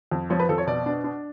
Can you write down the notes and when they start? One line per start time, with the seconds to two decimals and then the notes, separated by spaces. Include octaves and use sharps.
0.11 F2
0.30 F3 C#5
0.40 B4
0.49 F2 A4
0.58 C#5
0.67 B2 D5
0.86 D4
1.04 D4